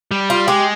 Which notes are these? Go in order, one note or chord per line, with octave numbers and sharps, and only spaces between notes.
G3
F4
G#3 G4